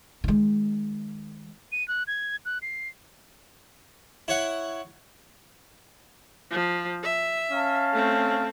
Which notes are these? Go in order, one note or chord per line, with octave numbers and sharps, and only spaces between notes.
D#3 G#3
D#7
F#6
G#6
F#6
C7
E4 C#5 F#5
F3
E5
C#4 F5 A5
A3 C4